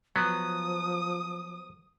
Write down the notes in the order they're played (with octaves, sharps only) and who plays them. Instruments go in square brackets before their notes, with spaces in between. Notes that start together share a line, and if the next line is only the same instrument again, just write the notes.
[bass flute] F3 [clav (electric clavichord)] F#3 B3 [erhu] D#6